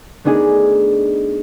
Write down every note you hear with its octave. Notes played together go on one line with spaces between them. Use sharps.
A3 B3 D4 D#4 G#4